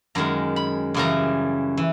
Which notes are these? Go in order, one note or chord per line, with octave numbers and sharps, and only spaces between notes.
F#2 D#3 G#3 A#5
B5
F#2 C#3 E3 G3 A#5
E3